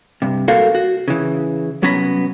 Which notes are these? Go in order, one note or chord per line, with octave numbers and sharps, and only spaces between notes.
G2 C3
A#3 F#4 A4 A#4 C5 F5
F#4
C#3 E3
C2 F#3 B3 C#4 A#5 B5